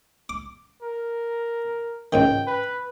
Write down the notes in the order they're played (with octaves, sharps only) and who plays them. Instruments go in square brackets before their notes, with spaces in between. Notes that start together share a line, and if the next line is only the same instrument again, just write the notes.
[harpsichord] D6
[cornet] A#4
[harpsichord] C#2 G#2 D#3 [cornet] G5
[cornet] B4